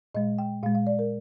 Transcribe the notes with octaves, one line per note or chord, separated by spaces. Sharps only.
A#2 G#3 D#5
G5
A#2 G#3 F5
F5
D5
A#4